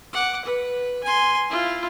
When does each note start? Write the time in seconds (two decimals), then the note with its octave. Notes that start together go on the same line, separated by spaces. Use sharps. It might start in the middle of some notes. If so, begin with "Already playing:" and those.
0.13 F#5 D6
0.45 B4
1.03 G#5 C6
1.49 E4 F4